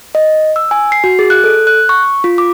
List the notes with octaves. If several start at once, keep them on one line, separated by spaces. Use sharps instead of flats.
D#5
E6
G#5
C7
F#4
G#4
F#6
A4
F#6
C#6
F4
D6